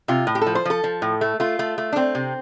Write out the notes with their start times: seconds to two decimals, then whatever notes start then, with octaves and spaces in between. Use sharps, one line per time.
0.08 C3 F4
0.27 A2
0.35 G4
0.41 A4
0.46 F3
0.55 C5
0.65 F3 A4
0.84 F3
1.02 A2
1.21 A3
1.40 A3 F4
1.59 A3
1.78 A3
1.92 D4
1.96 A3 C4
2.15 C3